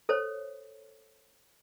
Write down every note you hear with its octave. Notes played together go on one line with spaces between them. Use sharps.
A4 C5 C#5